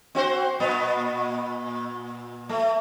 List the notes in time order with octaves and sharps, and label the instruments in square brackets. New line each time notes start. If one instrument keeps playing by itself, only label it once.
[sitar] C4 F#4 C5
A#2 B3
A3